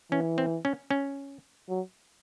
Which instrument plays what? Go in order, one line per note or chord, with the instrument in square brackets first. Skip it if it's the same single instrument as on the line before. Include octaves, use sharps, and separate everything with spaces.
[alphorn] E3 [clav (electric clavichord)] C#4
[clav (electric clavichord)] C4
C#4
C#4
[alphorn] F#3